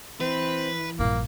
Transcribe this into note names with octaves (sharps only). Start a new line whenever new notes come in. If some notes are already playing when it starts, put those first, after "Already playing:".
E3 C4 B4
A#1 G2 A#3